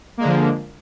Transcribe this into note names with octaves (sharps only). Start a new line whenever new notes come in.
D3 F3 G#3 A#3 D4